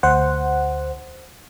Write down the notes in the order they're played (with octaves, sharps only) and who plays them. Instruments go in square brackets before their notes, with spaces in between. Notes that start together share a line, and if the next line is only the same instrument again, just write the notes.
[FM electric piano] D2 C5 F#5